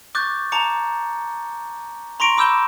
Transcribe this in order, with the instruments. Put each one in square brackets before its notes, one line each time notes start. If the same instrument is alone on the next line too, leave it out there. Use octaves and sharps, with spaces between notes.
[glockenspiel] C#6 D6 F#6 G6 A6
A5 A#5 D6 C#7
A#5 C6 C#6 A#6 D7
B5 D6 E6 G6 E7 G7